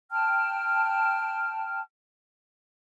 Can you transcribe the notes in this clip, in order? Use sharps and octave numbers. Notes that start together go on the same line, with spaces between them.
G5 A5 F6